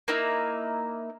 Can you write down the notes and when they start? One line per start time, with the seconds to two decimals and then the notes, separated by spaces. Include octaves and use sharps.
0.08 A#3 D#4 E4